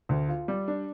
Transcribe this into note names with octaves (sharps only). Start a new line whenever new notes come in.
D2
F4
G3
D4